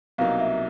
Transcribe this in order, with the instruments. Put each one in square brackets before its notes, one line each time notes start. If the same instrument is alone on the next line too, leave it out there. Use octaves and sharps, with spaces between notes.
[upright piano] C2 B2 F#3 A#3 D#4 [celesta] F5
[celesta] E5